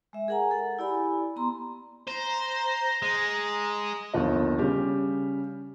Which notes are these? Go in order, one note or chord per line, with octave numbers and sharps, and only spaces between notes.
G#3 E5
G#4 A#4 F#5 G#5 A#5
A4 F#5
E4 G4 D5 G#5 B5
B3 A#5 C6
C5 A#5
G#3
G1 D#2 D3 F3 A4 D#5
C#3 G3 G4